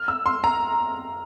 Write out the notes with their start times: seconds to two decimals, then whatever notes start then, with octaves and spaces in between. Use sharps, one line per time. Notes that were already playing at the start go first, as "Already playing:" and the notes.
Already playing: F6
0.08 E6
0.26 C6
0.44 A#5